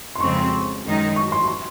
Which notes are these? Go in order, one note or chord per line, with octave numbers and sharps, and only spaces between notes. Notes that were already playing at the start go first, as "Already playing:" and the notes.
C6
F2 C#3 G#3 C4 C#6
C6
F#2 D#3 G#3 D#4
C#6
C6
C6